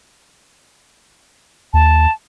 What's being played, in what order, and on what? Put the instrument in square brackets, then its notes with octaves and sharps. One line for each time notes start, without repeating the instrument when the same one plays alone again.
[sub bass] D#2 [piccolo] A5